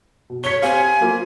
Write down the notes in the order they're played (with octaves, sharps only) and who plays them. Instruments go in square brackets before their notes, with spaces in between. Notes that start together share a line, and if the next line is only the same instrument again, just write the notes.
[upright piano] B2
[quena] C#5 [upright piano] B6 G7
[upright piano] C4 G4 F5 [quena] G#5
[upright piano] F#3 A#3 F4